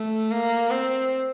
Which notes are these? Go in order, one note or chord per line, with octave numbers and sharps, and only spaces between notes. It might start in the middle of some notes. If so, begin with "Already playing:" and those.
Already playing: A3
A#3
C4